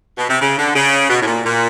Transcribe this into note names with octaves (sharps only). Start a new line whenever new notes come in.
B2
C3
C#3
D3
C#3
B2
A2
A#2
A#2